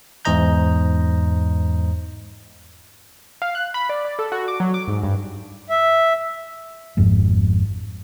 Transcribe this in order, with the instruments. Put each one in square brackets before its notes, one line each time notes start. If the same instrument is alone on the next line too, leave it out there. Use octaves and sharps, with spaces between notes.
[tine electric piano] E2 G#2 C5 D#5 A#5 G6
[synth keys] F5
F#6
B5
D5
D5
A4
F#4
D6
F#3
D6
G#2
G2
[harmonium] E5
[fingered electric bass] G#1 F2 G#2